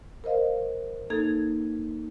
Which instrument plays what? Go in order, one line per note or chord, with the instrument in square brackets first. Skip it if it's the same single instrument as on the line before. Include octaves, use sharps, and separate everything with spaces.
[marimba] A#4 C5 D#5 F5
A#3 D#4 A4 G#6